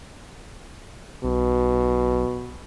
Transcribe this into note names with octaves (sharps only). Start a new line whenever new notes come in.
B1 B2